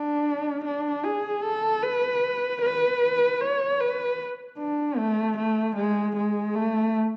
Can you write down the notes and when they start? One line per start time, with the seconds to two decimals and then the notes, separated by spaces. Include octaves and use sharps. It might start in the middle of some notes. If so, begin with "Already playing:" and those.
Already playing: D4
0.65 D4
1.04 G#4
1.43 A4
1.82 B4
2.62 B4
3.40 C#5
3.80 B4
4.58 D4
4.98 A3
5.37 A3
5.76 G#3
6.16 G#3
6.55 A3